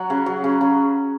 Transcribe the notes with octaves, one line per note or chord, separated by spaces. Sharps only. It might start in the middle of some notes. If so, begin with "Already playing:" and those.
Already playing: F#3 F#4 F#5
C#3
F#3
C#3
C#3